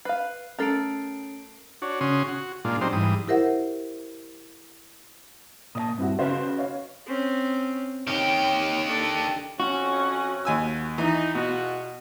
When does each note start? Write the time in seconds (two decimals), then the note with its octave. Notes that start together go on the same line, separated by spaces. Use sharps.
0.05 B4 F5 C7
0.59 A3 C#4 A4 A#4 C7 D7
1.82 D4 F#4 C#5
2.01 C#3 C#4 F#4 C6 D#6
2.28 F#4
2.65 A#2 G#3 D4 F4
2.81 F#3 C4 D4 D#4 G4 C5
2.93 G#2 E3 G3 D#6
3.28 E4 G4 A#4 C5 E5 F#5
5.75 A#2 D5 A5 D#6
5.98 G2 C4 E4 F#4
6.19 C#3 C#4 F#4 B4 C5 F5
6.58 C#5 F5
7.06 C4 C#4
8.07 D#3 G4 C#5
8.87 D4 A4
9.60 F2 C#4 F#4
10.45 D#2 G#5 E6
10.98 E3 D#4
11.35 E2 B2 F4 F#4